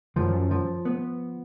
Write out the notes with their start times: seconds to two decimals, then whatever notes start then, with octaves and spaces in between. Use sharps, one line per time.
0.16 F#2 F3
0.51 F3
0.85 B3